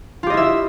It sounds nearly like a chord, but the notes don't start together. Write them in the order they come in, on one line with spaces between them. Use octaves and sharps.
F4 G4 D#5 E4 E5